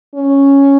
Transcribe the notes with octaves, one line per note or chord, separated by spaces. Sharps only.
C#4